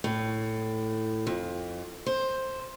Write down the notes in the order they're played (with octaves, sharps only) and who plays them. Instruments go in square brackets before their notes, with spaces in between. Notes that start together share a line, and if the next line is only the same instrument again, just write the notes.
[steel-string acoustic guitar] A2
F2
C5